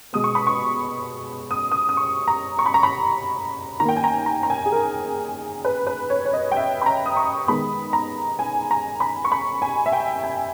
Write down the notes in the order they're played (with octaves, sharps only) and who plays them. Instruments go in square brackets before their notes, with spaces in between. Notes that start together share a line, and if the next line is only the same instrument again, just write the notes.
[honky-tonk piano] B2 G#3 B3 D#6
C#6
B5
C#6
D#6
D#6
D#6
C#6
A#5
C#6
B5
A#5
B5
D#3 A#5
A#3 G5
G#5
A#5
A#5
A#5
G#5
G#4
A#4
B4
B4
C#5
C#5
D#5
G5
E5
B5
A#5
D#6
C#6
D#3 G#3 B3 B5
A#5
G#5
A#5
B5
C#6
B5
G#5
E5
G5
G#5